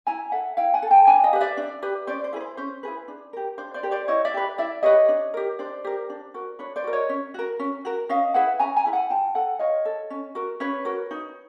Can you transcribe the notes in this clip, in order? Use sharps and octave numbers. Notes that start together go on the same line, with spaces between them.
E4 G#5 A#5
A4 E5 F#5
E4 F5 G5
F#5 G#5
A4
G5 A5
D4 G#5 A#5
D#5 F5
G4 B4
D5 E5
D4
G4 B4
C#4 C5 D5
C5
E4 G#4 B4
C5
C#4 C5
E4 G#4 B4
D4
G4 A#4
D4 C5
C5 D5
G4 A#4
C5 D5
E4 C#5 D#5
D5 E5
G4 B4
E4 D5 E5
G4 B4 C#5 D#5
D4
G4 A#4
D4 C5 D5
G4 A#4
D4
F#4 A#4
D4 B4 C#5
C5 D5
F#4 A#4
C#5 D#5
C#4
F#4 A#4
C#4
F#4 A#4
C#4 D#5 F5
E4 G#4 B4 E5 F#5
C#4 G#5 A#5
G#5 A#5
E4 G#4 B4
F#5 G#5
F4 G5 A5
A4 F#5 G#5
F4 C#5 D#5
A4
C#4
F#4 A#4
C#4 B4 C#5
F#4 A#4
D#4